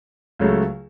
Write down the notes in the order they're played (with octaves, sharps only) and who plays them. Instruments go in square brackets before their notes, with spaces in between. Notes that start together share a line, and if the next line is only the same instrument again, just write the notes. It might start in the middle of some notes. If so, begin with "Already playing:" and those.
[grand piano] C#2 C#3 F#3 A3